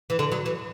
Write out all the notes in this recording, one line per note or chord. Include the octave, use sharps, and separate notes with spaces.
E3
D3
F#3
E3